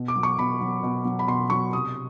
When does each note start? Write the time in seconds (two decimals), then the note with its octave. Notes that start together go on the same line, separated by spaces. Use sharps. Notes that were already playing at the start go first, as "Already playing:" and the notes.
Already playing: B2
0.08 D6
0.16 F#3
0.23 C#6
0.38 B2 B5
0.61 F#3
0.83 B2
1.05 F#3
1.19 B5
1.28 B2 C6
1.50 F#3 C#6
1.73 C3 D#6